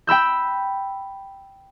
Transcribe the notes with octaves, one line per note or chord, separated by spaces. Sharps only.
G5 B5 E6 G6